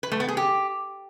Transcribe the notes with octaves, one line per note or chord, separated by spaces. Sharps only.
B4
A3
B3
G#4
G4